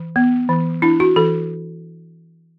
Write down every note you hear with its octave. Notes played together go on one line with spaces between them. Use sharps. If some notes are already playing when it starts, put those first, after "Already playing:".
Already playing: E3
B3
E3
D4 E4
F#4
E3 A4